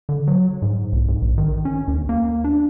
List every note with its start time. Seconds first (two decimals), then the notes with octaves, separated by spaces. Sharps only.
0.09 D3
0.27 F#3
0.62 G#2
0.92 C2
1.08 G#2
1.22 A#1
1.38 D#3
1.65 C#4
1.88 D#2
2.09 A#3
2.44 D4